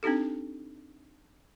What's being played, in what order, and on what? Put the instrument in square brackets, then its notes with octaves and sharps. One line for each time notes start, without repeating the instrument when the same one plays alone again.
[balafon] C4 D4 D#4 G4 A4